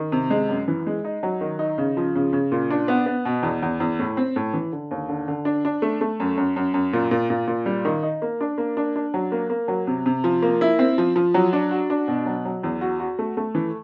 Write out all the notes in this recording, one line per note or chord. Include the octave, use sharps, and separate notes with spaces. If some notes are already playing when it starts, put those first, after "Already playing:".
Already playing: D#3
C3
G#3
F#2
E3
G#3
D#4
F#3
D#3
D#4
C#3
F3
C#3
C#3
A#2
D4
B3
B3
B2
E2
E2
E2
A2
C4
A2
E3
D3
D#2
D3
D3
D4
D4
A3
A3
F#2
F#2
F#2
F#2
A#2
A#2
A#2
A#2
G3
D#3
D#4
A#3
D4
A#3
D4
D4
F#3
A#3
A#3
F#3
C3
C3
F3
A#3
E4
C4
F3
F3
F#3
D4
F#4
D4
B2
F#3
F#3
E2
F#4
F#4
A3
A3
E3